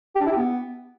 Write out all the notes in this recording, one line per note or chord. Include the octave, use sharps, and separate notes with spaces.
G4
D4
E4
G4
B3